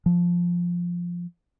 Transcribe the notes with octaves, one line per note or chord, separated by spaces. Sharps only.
F3